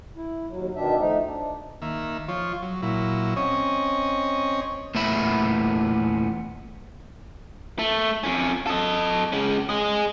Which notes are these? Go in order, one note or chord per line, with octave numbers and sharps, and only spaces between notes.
E4
D#2 F#3
B2 D#3 D4 E5
F3 A3 D#4
D4
D#3 A#3 E5
F3 F4 C#5
F#3
A#2 F#3 E4
C4 C#4 C#5 D#5
E2 A#2 A3 B3 E5 B5
A3
F2 C#4
A4 D#5
G#3 C#4
G#4 D#5